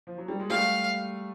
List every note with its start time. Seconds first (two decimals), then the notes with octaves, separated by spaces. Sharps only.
0.07 F3
0.18 F#3
0.28 G3
0.40 G#3
0.49 G3 A3 F5